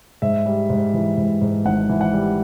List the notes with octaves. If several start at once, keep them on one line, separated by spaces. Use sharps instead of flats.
G#2 E5
G3
G#2
E3
G#2
G#2
G#1 F#5
E3
F#5
G3